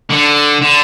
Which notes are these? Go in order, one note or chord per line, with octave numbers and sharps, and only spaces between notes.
D3
D3